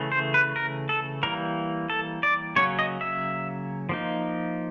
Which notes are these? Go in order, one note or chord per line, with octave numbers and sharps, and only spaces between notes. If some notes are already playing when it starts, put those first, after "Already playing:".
Already playing: C#3 E3 A3
C5
B4
A#4
A4
E3 G3 A#3 A#4
A4
D5
C#3 F#3 A#3 C#4 C#5
D#5
E5
F3 A#3 D#4